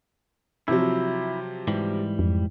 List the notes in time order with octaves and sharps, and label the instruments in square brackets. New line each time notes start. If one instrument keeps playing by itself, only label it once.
[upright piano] C3 F3 F#3 [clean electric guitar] E4
[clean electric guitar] G#2 E3 G3
[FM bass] F2